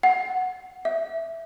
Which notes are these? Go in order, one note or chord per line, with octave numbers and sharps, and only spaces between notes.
F#5
E5